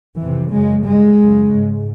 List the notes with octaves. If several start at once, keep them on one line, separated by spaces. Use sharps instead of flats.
F2 C3 E3
F#2 C#3 G#3
G2 G#3
F#2 C#3
G#2